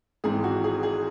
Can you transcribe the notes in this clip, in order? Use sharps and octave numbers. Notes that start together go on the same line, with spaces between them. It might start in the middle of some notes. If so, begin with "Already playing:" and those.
G#1 G#2 E3 C4 G#4
F#4
G#4
G#4